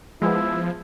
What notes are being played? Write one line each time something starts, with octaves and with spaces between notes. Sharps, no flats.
F3 G#3 B3 E4